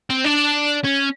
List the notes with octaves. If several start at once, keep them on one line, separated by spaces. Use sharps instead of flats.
C4
D4
C#4